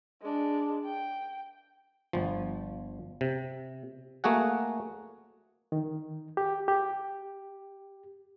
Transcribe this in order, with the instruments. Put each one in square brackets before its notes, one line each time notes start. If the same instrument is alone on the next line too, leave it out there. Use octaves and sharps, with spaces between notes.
[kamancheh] G#3 D4
G5
[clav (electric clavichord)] G1 F3
C3
A3 A#3 F#4 G#4 F#5
[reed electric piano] D#3
G4
G4